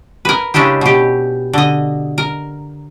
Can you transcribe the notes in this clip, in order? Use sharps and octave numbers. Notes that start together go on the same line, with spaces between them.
A#4 B4
C#3 G#3 C#4 D4 E4 G4
B2 G4
D3 D#5
A#4